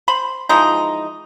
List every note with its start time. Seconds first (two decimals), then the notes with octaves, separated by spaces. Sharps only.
0.08 C5 B5
0.49 E3 F3 G#3 D#4